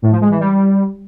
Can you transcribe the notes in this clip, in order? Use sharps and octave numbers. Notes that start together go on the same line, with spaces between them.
A2
F3
G#3
E3
G3